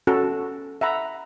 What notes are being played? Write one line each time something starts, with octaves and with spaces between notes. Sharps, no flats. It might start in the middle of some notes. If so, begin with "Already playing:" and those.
C#4 F#4 A4
E5 F#5 A#5 B5